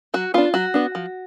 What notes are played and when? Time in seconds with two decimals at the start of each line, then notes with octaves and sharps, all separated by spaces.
0.14 F#3 F#4
0.34 B3 D4 F4
0.54 F#3 F#4
0.74 B3 D4
0.95 F3